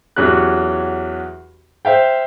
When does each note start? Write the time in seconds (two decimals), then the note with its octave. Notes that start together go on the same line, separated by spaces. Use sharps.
0.16 E2 F#3 C#4 F#4 G4 F#6
1.85 C5 E5 F5 G5